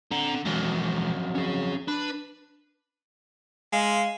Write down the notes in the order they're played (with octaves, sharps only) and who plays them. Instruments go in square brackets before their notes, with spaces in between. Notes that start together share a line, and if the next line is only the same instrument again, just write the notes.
[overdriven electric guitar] D3 [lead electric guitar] C4 A#5
[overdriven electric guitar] F2 F#3 [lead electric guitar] E3 G#3
[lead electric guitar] C#4 G#4
[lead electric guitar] D4 [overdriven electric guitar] B4
[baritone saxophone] G#3 [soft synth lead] F5